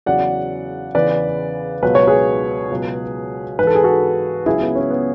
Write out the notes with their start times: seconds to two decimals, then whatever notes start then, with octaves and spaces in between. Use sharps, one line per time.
0.06 E2 C#3 F#3 D5 F#5
0.95 E2 C#3 E3 B4 D5
1.83 C#2 B2 F#3 B4
1.95 C#5
2.07 G#4 B4
2.71 C#2 B2 F#3
3.59 G#2 B4
3.63 E3 A4
3.75 G#4
3.84 F#4 A4
4.46 C#2 C#3 F#3 E4 G#4
4.61 B3
4.75 C#4
4.91 B3